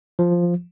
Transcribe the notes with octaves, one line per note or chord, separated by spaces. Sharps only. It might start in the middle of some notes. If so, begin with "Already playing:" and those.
F3